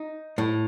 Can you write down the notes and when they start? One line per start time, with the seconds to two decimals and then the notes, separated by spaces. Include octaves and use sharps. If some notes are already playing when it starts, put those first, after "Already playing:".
Already playing: D#4
0.38 A2